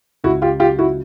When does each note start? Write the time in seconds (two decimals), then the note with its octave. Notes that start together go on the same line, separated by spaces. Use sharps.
0.24 C#2 E4 F#4
0.42 F4 G4
0.60 F#3 F4 G4
0.79 E4 F#4